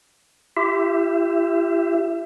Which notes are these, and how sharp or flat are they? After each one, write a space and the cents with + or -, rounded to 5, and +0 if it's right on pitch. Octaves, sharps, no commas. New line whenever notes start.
E4 +45 G4 +0 E5 +20